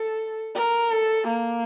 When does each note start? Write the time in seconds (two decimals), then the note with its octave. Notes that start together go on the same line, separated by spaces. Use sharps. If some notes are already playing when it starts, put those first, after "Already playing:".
Already playing: A4
0.55 A#4
0.91 A4
1.28 A#3